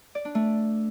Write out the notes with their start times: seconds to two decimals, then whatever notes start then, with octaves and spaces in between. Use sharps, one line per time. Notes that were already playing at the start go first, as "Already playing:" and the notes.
0.15 D5
0.25 D4
0.35 A3